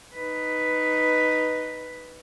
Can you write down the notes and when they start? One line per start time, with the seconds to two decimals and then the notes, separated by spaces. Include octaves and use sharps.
0.15 D#4 B4